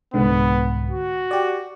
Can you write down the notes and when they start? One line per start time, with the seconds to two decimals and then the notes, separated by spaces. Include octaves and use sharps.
0.14 C2 G#2 D3 B3
0.91 F#4
1.31 G4 D5